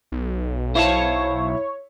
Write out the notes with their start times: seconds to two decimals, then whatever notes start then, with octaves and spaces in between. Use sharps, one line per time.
0.12 B1
0.75 E4 C5 C#5 F5 A5